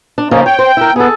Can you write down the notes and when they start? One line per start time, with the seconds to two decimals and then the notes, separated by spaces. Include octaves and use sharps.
0.18 D4
0.31 C#3 F3 A#3 C#4 D#4
0.46 C#5 G5
0.59 C5
0.77 E4 A#4
0.96 B3 G#4 A4